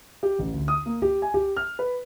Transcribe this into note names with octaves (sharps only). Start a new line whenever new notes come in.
G4
A1
D2
D#6
A#3
G4
G#5
G4
F6
B4